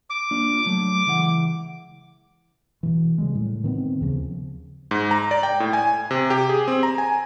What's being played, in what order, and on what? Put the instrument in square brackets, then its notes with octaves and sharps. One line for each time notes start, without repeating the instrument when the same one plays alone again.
[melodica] D6
[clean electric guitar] A#3 D4 F4
F#3 A3
C#2 E3 F#5
[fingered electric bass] B2 E3
C#3 G3 G#3
A2
D#3 B3 C4
D#2 C#3 F3
[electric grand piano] G#2
A#5
D5
G5
A2
G#5
C3
G4
G#4
C4
A#5
G#5